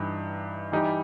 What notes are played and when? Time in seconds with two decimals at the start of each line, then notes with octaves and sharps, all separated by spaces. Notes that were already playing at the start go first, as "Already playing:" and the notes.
Already playing: G2 E3 G3 D#4
0.72 E3 G3 D#4 G4